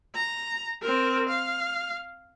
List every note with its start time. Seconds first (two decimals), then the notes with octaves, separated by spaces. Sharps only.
0.14 A#5
0.82 C4 A#4
1.29 F5